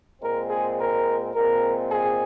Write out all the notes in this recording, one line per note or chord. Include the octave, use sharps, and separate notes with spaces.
A#2 G#3 C4 A#4
G#4
A#4
A#2 G#3 C4 A#4
G#4